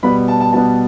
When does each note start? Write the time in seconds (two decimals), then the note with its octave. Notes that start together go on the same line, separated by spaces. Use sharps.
0.03 B2 G3 B3 B5
0.28 A5
0.40 A5
0.53 B2 G3 B3 A5